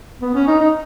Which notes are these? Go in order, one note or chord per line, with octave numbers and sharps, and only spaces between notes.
B3
C#4
D#4
D#4